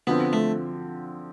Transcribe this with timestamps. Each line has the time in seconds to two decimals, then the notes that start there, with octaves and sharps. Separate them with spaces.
0.07 D3 F3 B3 C4
0.33 A3